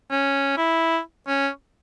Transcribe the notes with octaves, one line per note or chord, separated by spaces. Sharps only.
C#4
E4
C#4